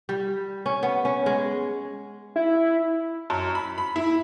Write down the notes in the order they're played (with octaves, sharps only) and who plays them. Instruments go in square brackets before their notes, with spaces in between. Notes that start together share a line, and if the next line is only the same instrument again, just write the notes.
[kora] G3
C#4
B3
C#4
G#3
[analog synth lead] E4
[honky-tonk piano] F#2
B5
B5
E4